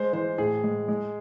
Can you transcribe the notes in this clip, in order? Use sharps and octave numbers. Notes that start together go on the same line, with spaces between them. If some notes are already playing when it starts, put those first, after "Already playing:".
Already playing: G#3 C5
E3 C5
A2 G#4
G#3
G#3